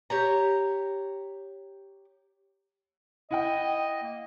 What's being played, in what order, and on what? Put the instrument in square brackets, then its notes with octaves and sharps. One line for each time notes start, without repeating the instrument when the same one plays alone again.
[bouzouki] G4 C#5 A#5
[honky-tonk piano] E4 F#5 G5 [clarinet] D#5
[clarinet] A#3